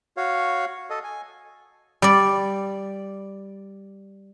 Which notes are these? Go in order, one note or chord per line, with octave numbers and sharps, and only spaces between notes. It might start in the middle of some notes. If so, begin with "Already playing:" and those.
F#4 C#5 F5
A4 D#5
G#5
G3 D5